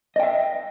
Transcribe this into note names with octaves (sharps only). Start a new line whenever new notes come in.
D#5 E5 G5